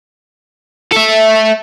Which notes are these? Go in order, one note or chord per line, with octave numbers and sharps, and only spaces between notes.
A4 E5